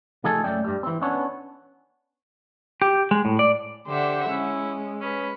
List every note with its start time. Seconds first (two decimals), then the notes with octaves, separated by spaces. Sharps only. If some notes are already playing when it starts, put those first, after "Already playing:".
0.24 C3 F3 A3 D#4 G#4 A4
0.44 F#2 A3 C#4 D5 G5
0.64 G2 G3
0.83 E3 C4
1.02 B3 C#4 D4 C#5
2.82 G4
3.11 G#3
3.25 A2
3.39 D5
3.87 D3 G4 C5 E5 F#5
4.30 G#3 C#4 E4
5.01 C#4 B4